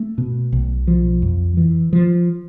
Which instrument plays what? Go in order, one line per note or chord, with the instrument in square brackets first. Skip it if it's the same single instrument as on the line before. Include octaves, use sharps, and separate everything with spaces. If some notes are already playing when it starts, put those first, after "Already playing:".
Already playing: [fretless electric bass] A3
B2
B1
F3
F2
E3
F3